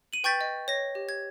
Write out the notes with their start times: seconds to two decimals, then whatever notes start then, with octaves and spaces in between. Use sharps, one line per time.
0.13 D#7 F#7
0.24 B4 G5 C#6 G6 A6 B6
0.41 D#5
0.68 C#5 A#6
0.95 G4
1.09 G#6